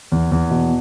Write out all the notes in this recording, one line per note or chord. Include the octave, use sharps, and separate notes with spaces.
E2
E2
B2